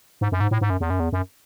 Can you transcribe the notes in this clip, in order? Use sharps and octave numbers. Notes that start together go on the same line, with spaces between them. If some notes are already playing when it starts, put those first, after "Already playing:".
G#2
F#2
G#2
A2
G#2
F#2
E2
F#2
E2
F#2